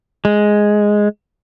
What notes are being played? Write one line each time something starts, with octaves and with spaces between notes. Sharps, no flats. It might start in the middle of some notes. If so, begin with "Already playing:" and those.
G#3